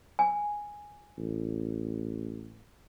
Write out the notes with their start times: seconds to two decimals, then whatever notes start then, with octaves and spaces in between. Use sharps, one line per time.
0.19 G#5
1.17 A1